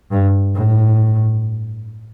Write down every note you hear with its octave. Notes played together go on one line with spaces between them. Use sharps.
G2
A2